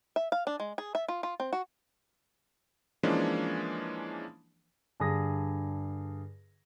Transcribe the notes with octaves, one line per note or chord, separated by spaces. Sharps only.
E5
F5
D4
G#3
G#4
E5
F4
F4
C4
F#4
E3 F3 G#3 A#3 C#4 D4
G2 D3 G#4 D#6 A#6